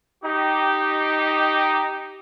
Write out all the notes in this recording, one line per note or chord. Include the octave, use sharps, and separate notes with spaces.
D#4 G4